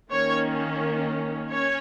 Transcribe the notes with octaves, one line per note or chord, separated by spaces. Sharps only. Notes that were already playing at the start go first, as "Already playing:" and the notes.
D#3 A#3 C#4 C#5
C#4 C#5